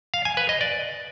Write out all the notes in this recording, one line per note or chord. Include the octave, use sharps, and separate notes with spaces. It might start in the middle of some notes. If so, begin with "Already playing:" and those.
F5
G#5
B4
D#5
D5